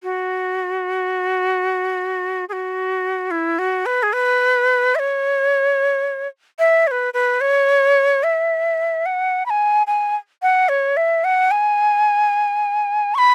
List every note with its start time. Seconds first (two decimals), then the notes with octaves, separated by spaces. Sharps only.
0.03 F#4
2.49 G#4
2.53 F#4
3.31 E4
3.59 F#4
3.86 B4
4.03 G#4
4.13 B4
4.95 E5
4.99 C#5
6.59 E5
6.87 C#5
6.91 B4
7.14 B4
7.41 C#5
8.23 E5
9.06 F#5
9.46 B5
9.50 G#5
9.87 G#5
10.42 F#5
10.69 C#5
10.97 E5
11.24 F#5
11.51 G#5
13.15 C#6
13.18 B5